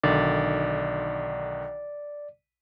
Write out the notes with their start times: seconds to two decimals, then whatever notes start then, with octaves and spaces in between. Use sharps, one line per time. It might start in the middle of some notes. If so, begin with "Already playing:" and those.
0.03 B1 D3 D#3 D5